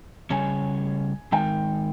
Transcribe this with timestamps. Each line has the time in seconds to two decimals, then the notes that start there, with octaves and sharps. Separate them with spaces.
0.30 C#3 G3 C#4 G#4 C#5 G#5
1.32 D#3 G#3 D#4 A#4 G5